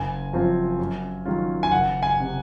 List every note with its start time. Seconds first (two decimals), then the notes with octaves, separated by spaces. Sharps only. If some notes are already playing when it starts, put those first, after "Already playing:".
Already playing: F#1 G#5
0.33 F#2 F3 C4 F4
0.79 F#2
1.26 D#3 F#3 C#4 F4
1.63 G#5
1.72 F#1 F#5
2.03 G#5
2.20 C3